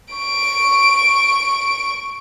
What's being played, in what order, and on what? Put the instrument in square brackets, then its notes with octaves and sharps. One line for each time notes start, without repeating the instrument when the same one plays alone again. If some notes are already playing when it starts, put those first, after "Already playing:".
[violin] C#6 D7